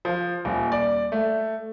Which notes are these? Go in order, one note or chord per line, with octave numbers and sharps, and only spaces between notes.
F3
D#1
D5
A3